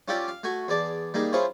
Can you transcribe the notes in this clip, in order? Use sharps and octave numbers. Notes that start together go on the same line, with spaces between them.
C#4 F4 G4 A4 D5 G5
F5
A3 F#4 G#5 C#6
E2 G#4 D5 A5
G3 A#3 D#4 G#4
C#4 E4 F4 G#4 C5 C#5